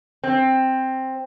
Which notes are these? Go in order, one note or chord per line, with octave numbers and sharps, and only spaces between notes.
C4